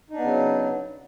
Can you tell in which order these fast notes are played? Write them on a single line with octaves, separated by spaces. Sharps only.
D#4 D4 B3 C#3 F#3